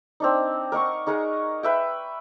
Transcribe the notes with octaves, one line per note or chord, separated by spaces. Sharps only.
C4 D4 D#4
A#4 D#5 F#5 C#6
D#4 G#4 A#4 F#5
B4 E5 G5